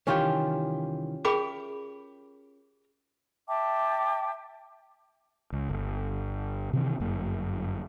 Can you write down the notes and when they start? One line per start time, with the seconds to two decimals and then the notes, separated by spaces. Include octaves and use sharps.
0.07 C2 D#3 E3 C#4 F4 G4
1.25 G#4 A#4 E5 G5 B5 D6
3.47 E5 G5 A5 D6
5.53 C#2
5.69 G1
6.73 C3 D#3 E3 C4
7.00 G1 F#2 A#3